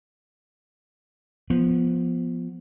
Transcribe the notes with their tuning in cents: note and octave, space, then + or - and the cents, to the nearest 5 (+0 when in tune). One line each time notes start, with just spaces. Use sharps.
F3 +0 B3 -10